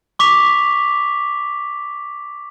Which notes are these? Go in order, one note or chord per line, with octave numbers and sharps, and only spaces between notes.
C#6 D6 B6 F7